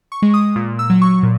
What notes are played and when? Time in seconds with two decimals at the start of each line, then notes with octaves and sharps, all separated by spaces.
0.12 C#6
0.22 G#3
0.34 D#6
0.56 A#2
0.79 E6
0.90 F#3
1.02 C#6
1.23 A#2